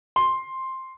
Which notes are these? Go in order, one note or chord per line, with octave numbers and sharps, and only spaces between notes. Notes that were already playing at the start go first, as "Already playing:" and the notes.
C6